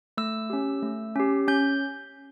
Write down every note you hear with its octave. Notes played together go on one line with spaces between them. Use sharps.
A3 E6
C#4 G4
A3
C#4 G4
C#4 G6